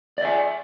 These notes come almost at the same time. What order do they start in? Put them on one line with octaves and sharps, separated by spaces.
D5 E5 G#5